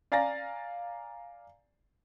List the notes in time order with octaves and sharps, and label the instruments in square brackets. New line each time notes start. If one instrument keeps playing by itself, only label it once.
[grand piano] D5 F5 G#5 A#5 A6 A#6